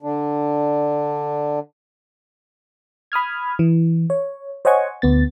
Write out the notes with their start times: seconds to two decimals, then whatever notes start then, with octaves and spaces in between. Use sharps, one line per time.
0.03 D3 D4
3.12 B5 D#6 F6 G#6
3.59 E3
4.10 C#5
4.65 C5 C#5 D#5 F#5 G#5 C#6
5.02 D2 B3 A6